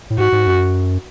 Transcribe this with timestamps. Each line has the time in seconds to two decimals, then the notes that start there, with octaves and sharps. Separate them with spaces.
0.10 A2
0.18 G#2 F#4
0.32 G#2
0.47 F#2